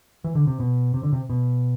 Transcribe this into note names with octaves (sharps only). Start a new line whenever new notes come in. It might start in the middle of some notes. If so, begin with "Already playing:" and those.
E3
D3
C3
B2
C3
D3
C3
B2